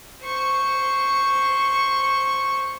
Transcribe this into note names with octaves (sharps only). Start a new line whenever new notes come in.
C5 C#6